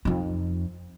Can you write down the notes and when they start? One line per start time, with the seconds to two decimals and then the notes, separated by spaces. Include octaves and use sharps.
0.05 F2 D#4